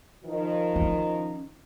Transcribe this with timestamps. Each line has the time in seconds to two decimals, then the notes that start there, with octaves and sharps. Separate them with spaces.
0.24 D#3 F3
0.76 C#4